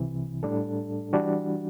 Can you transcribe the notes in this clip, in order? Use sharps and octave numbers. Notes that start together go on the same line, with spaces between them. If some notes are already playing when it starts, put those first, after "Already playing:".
Already playing: C2 C3 E3
A2 G3 D4 A4
E3 G3 D4 F#4